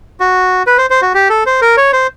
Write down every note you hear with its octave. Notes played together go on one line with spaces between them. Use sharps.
F#4
B4
C5
C5
F#4
G4
A4
C5
A#4
C#5
C5